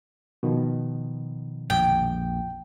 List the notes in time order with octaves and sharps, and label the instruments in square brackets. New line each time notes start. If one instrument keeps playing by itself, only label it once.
[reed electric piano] B2 D#3 F3
[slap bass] A#1 F2 [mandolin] G5